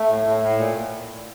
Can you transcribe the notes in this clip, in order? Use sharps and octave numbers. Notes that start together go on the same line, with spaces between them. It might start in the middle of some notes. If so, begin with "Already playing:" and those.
Already playing: A3
A2
A2
A2
A#2